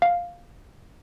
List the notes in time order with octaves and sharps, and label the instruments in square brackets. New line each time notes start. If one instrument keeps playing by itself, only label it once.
[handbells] F5